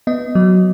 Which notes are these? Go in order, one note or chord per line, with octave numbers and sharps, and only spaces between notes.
B3 D#5
F#3